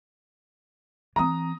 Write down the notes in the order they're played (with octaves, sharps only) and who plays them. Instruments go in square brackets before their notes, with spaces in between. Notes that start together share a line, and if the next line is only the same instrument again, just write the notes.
[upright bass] E3 C4 [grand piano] A#5 D#6